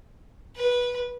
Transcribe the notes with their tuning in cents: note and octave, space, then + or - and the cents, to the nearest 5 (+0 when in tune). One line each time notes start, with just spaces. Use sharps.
B4 -15